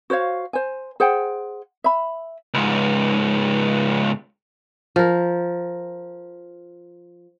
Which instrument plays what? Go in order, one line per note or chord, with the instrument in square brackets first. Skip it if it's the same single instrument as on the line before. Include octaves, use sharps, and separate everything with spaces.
[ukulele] F#4 C5 C#5 F5
C5 G#5
G#4 C5 F#5 G5
E5 B5
[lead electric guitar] C#2 G#2
[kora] F3 A#4